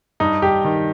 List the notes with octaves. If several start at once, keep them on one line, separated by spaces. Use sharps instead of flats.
G2 D#4
G2 G4
D#3